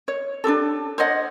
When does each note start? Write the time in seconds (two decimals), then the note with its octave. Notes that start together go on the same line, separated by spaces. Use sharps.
0.08 C#5
0.44 D4 D#4 G4 A4
0.98 C5 C#5 D#5 F#5